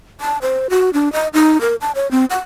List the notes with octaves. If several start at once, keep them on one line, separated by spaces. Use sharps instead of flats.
A5
C5
F#4
D4
D#5
D#4
A#4
A5
C#5
C4
F#5